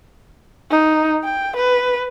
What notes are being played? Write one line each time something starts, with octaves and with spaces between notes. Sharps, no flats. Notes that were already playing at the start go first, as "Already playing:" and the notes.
D#4
G5
B4